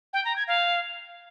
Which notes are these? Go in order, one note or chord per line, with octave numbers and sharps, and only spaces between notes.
G5
A#5
G#6
F5